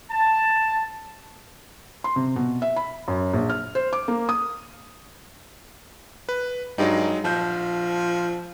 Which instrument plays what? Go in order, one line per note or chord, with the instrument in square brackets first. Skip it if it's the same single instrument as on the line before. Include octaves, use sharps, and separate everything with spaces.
[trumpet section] A5
[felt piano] C6
C3
B2
E5
B5
F#2
A#1
F6
C5
D6
A#3
D#6
[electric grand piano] B4
[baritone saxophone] G2 [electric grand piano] F#3 G#3 D#4
[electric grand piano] A#1 G6 [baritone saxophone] F3